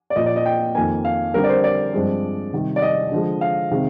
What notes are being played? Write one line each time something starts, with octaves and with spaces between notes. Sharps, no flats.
D5
A#2 F3 A#3 D#5
D5
D#5
G5
F2 D#3 A#3 G#5
F5
D3 G3 C4 A#4
D5
C5
D5
G2 F3 G#3 C4
C3 D#3 G3
D5
D#5
D3 F3 G#3
F5
C3 D#3 G#3 C4